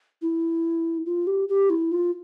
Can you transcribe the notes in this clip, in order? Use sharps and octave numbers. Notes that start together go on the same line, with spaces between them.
E4
F4
G4
G4
E4
F4